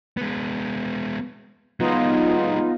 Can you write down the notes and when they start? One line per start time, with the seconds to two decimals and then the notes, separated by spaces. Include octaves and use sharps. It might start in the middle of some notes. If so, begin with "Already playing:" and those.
0.17 G#3 B3
1.80 F#3 G#3 B3 D#4 F4